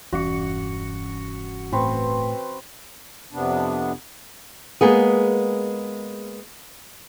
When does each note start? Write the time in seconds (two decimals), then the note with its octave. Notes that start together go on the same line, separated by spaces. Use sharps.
0.13 E1 G2 E3 C#4 F#4 C#7
1.72 A2 C4 B4 C#6
3.33 F2 C3 B3 D4
4.81 G#3 A#3 B3 G#4